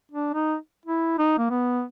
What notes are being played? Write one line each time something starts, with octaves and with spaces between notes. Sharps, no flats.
D4
D#4
E4
D#4
A#3
B3